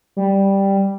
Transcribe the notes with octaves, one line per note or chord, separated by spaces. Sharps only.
G3